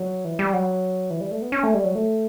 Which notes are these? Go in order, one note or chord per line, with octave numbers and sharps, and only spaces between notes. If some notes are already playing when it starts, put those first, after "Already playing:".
Already playing: F#3
E3
G3
F#3
E3
G3
A3
B3
C#4
A3
G3
F#3
A3